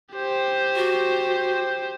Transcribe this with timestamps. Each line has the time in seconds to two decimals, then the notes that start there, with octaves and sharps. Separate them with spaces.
0.14 G4 C5
0.76 F#4